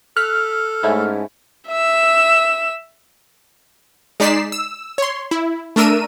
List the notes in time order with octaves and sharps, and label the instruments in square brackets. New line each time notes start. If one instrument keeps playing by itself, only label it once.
[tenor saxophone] A4 [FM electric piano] F6 [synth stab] F#6 B6
[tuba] G#2 [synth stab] A3 C#4 E4
[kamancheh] E5 E6
[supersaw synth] G#3 D#4 D5 B6 C7 E7
E6
C#5 C6
E4
A3 D4 A#4 E6 D#7